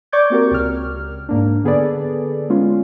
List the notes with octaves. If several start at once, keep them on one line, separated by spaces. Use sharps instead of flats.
D5 C#6 D6 G6 G#6
A#3 C4 F#4 G4 A#4
C#2 C#3 F6
G#2 A#3 D4
D3 B3 G#4 A4 B4 D5
G#3 B3 C#4 F4